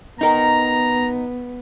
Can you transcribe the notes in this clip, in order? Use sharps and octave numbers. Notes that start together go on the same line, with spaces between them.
B3 D#4 A#4 A#5